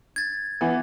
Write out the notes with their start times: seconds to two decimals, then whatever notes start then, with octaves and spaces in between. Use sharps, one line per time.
0.16 G#6 A6
0.61 E3 B3